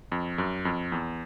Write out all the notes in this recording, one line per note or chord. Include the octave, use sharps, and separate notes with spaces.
F2
F#2
F2
E2